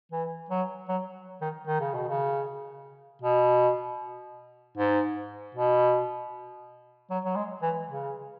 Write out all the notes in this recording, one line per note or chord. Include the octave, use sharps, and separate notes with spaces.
E3
F#3
F#3
D#3
D#3
C#3
B2
C#3
B2
G#2
B2
F#3
F#3
G#3
E3
C#3